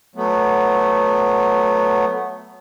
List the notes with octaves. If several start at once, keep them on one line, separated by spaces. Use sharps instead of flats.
F#3 A3 B3